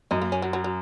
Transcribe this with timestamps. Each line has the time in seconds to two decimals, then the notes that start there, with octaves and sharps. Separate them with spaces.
0.11 F#2 D#4
0.22 A#3
0.32 C#4
0.42 F#3
0.53 F#3
0.64 F#3